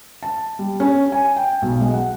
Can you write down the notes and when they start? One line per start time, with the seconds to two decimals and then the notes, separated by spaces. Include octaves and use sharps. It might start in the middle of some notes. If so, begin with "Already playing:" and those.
0.23 A5
0.59 G3
0.80 C#4
1.12 G#5
1.36 G5
1.62 B1
1.81 G#3
1.93 F#5